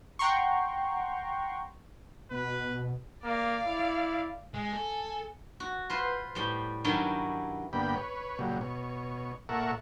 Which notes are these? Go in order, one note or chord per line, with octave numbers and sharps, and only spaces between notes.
F#5 G5 A#5 C6 C#6
B2 B4
A#3 D5 F5
E4
G#3 G#5
A4
F#4
F4 B4 C5
A2 G3 G5
G2 D#3 F#3 C#4 E4 G5
G2 D3 A#3 B3 G5 B5
B4 C#5
A#2 C#3 F#3 G3
B2 C#5
A#2 A4 A#4 E5 F#5 C#6